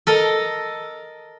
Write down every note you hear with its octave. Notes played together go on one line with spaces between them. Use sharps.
A4 A#4 D#5